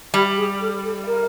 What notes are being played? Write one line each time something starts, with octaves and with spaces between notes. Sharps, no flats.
G3 G4
G#4
A4
A4
A#4